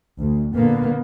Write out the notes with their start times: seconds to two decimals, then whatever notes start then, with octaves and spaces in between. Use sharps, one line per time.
0.21 D2
0.54 A#2 D3 A#3 B3